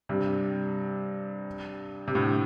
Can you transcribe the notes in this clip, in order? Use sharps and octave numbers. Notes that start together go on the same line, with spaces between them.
G2 C3
C3
A2 D3